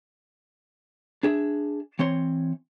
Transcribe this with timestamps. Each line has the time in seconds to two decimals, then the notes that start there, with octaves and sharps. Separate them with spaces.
1.23 D4 G#4 E5
1.99 E3 C4 C#5 C6